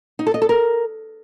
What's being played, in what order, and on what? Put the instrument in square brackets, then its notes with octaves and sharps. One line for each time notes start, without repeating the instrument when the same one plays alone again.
[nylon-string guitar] D#4
A4
D#5
A4
A#4